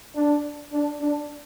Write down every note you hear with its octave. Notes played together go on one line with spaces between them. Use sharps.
D4
D4
D4